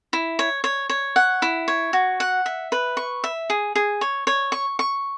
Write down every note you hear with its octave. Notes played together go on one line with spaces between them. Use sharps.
E4
C#5
C#5
C#5
F#5
E4
C#5
F#4
F#5
E5
B4
C#6
E5
G#4
G#4
C#5
C#5
C#6
C#6